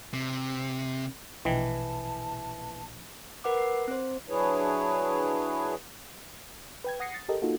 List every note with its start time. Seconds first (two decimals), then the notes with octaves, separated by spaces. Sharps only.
0.14 C3
1.45 A#1 B2 E3 D#5 G5 A5
3.44 A#4 B4 F#5 D6
3.58 C7
3.88 C4 C5
4.29 F#3 D4 E4 G#4 B4 C#5
6.84 B4 G5 G#6
7.00 F#5 D#6 A#6 C7 C#7
7.14 A6
7.29 G4 A4 A#4 D#5
7.42 A#3 D#4 F4 F#4 A4